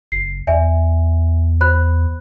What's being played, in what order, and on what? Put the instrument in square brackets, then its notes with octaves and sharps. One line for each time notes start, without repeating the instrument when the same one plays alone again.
[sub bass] F#1 [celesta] C7
[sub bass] E2 [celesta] D5 E5 G#5
[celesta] C5 B5 F#6